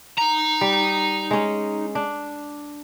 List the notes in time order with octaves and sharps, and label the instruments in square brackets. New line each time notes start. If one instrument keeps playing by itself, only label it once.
[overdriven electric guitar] D#4 A#5
[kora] G3
G#3 C#4
D4